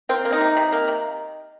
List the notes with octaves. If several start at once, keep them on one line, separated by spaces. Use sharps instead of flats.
A#3 C4
A#3
D#4
C3
C3
A#3
C3